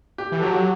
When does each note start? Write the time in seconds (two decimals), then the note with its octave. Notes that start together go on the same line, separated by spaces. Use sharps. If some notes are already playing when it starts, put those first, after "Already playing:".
0.18 G4
0.32 E3
0.38 A4
0.42 F#3 G4
0.55 F#4